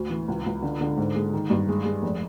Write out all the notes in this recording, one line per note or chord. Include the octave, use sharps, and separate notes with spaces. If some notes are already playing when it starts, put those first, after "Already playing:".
Already playing: D2
E3
C#2
C#2
D3
D3
G#2
G#3
D#3
G2
G#3
G#3
F1